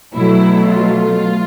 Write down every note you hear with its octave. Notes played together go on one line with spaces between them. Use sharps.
B2 F#3 A3 E4
F4